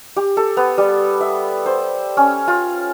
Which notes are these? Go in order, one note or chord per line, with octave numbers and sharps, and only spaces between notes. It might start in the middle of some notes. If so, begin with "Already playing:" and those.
G4
A4
B3
G3
E5
C5
C#4
F4